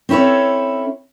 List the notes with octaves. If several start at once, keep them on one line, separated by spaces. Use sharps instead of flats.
C4 C#4 E4 A4 C#5